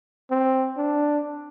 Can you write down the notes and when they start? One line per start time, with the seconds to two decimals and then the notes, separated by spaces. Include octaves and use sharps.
0.31 C4
0.77 D4